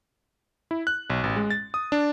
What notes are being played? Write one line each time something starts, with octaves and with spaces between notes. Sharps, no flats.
E4
F#6
B1
A1
G#3
A6
D#6
D4